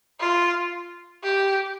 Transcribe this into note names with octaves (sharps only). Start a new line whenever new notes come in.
F4
G4